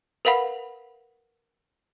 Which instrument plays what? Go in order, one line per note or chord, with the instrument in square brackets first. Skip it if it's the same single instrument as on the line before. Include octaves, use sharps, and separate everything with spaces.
[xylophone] A#4 B4 F5 F#5 B5